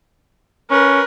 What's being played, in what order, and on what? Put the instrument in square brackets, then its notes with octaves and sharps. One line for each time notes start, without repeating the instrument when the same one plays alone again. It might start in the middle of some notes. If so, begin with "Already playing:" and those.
[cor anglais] C#4 [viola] A#4 B4